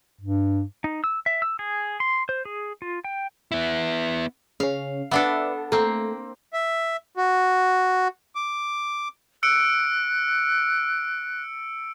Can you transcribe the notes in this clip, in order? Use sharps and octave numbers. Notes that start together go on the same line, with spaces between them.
G2
D#4
E6
E5
E6
G#4
C6
C5
G#4
F4
G5
B3 E4
C#3 C#4 F5
B3 D4 A4 B4 D5 E5
A3 A#3 C4
E5
F#4
D6
E6 F#6 C#7 D7